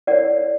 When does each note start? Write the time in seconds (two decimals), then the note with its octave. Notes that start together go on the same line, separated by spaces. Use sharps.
0.07 E4 A#4 C#5 D5 F#5